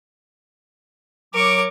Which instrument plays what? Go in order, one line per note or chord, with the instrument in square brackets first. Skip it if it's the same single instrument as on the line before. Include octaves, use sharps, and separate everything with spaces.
[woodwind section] F#3 C#5 D6 [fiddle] A#4 C#6